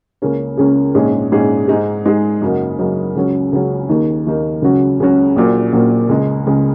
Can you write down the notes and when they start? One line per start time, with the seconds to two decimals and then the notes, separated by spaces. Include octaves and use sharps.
0.22 C#2 C#3 A#3 C#4 G#4
0.57 C#2 C#3 A#3 C#4 G#4
0.94 A#1 G#2 G#3 C#4 G#4
1.32 A#1 G#2 G#3 C#4 G#4
1.68 G#2 G#3 D#4 G#4
2.05 G#2 G#3 D#4 G#4
2.41 F#2 C#3 F#3 A#3 D#4
2.78 F#2 C#3 F#3 A#3 D#4
3.16 C#2 C#3 F#3 C#4
3.53 C#2 C#3 F#3 C#4
3.89 D#2 D#3 A#3 D#4
4.26 D#2 D#3 A#3 D#4
4.62 C#2 C#3 F#3 C#4 F#4
5.00 C#2 C#3 F#3 C#4 F#4
5.36 A#1 A#2 F#3 A#3
5.73 A#1 A#2 F#3 A#3
6.09 C#2 C#3 G#3
6.47 C#2 C#3 G#3